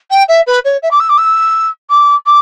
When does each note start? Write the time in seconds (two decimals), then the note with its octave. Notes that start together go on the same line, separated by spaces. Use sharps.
0.11 G5
0.29 E5
0.47 B4
0.65 C#5
0.83 E5
0.91 D6
1.00 E6
1.09 D6
1.18 E6
1.90 D6
2.26 D6